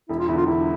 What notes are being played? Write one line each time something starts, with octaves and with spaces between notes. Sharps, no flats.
E1 E4
F4
E2 D3 E4
F4
E1 E4